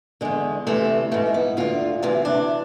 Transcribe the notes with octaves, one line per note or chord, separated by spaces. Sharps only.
E2 D3 G#3
D2 C3 E3 A3
G#2 E3 A3
B3
D2 D3 F4
D2 C3 E3
D4